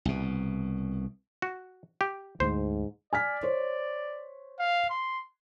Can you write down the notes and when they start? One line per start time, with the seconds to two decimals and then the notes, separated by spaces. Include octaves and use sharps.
0.05 C2 B2
1.42 F#4
2.01 G4
2.40 D2 G#2 A3 C5
3.13 D5 G#5 F6 B6
3.43 C5 C#5
4.59 F5
4.90 C6